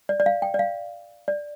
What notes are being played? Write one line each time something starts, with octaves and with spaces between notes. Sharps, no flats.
D5
D5
F5
G5
D5
F5
D5